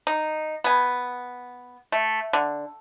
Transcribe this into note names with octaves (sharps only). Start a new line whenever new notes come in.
D#4
B3 G#5
A3
D3